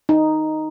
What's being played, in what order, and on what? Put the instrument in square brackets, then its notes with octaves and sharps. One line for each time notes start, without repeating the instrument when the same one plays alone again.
[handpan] D#4